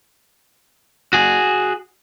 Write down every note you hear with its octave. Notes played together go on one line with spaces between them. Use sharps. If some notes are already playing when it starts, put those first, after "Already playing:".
F#4 G#4